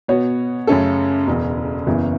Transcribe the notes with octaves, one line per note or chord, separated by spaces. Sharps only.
B2 B3 F#4 C#5
F#2 C#3 A3 C#4 A4
E1 E2 C#3
F#1 E2 C#3 E3 B3